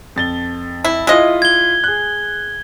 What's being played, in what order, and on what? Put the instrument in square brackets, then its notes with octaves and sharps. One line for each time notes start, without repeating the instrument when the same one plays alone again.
[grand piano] F2 A6 G7
[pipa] E4
[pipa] G#3 D#5 [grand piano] E4 F4
[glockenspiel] G#6 G7
[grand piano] G#4 F#6